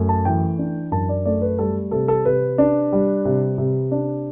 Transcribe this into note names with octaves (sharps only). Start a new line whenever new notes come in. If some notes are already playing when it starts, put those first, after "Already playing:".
Already playing: F#2 A3
A5
E3 G5
D4
F#2 A5
D5
A3 D5
B4
G3 A4
C3 A4
A4
C3 B4
D4
G3
C3
C3
D4